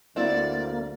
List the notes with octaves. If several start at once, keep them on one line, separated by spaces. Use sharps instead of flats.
D2 A#3 C4 E4 F#4 D5